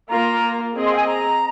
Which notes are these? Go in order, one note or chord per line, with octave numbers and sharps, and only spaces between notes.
A#3 F4 A#4 A#5
C4 G#4 D#5
C6
F5
G#5
A#5